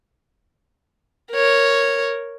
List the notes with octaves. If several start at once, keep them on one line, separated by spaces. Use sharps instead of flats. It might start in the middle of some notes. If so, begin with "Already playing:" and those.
A#4 C#5